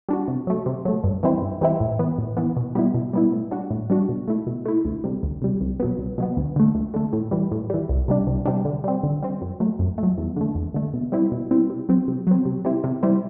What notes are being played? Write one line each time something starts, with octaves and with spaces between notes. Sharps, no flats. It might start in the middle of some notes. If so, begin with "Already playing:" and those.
G3 D4 F#4
C3
F#3 A3
C3
F#3 A3
G2
E3 G3 C4 E4
G2
E3 G3 C4 E4
A2
E3 B3
A2
E3 B3
B2
G3 B3 E4
B2
G3 B3 E4
A2
G3 D4 F#4
A2
G3 D4 F#4
B2
A3 E4
B2
A3 E4
D2
C3 G3
D2
C3 G3
C2
B2 F#3 B3
C2
B2 F#3 B3
D2
D3 A3
D2
D3 A3
A2
E3 G3
A2
E3 G3
C2
C3 G3 D4
C2
C3 G3 D4
D3
G3 C4
D3
G3 C4
F#2
F#3 A3
F#2
A3
F#3
E2
D3 A3
E2
D3 A3
B2
G3 C4 E4
B2
G3 C4 E4
C3
F#3 C4
C3
F#3 C4
C3
G3 C4 E4
C3
G3 C4 E4